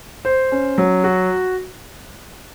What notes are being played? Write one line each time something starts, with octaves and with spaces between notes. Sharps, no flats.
C5
C#4
F#3
F#4